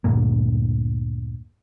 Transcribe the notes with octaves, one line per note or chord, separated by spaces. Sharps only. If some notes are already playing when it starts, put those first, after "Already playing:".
D2 G2 A#2 A#3